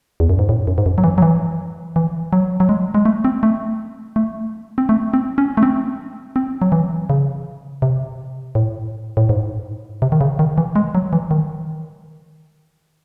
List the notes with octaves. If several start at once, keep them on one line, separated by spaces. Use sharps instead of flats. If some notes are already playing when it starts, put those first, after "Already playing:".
E2
F#2
G#2
A2
F#2
G#2
F#2
F#3
E3
F#3
E3
E3
F#3
F#3
G#3
G#3
A3
C4
A3
A3
C4
A3
C4
C#4
A3
C4
C4
F#3
E3
C#3
C3
A2
A2
G#2
C3
D#3
C#3
D#3
E3
G#3
F#3
E3
D#3